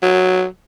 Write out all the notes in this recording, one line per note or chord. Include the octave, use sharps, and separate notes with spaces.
F#3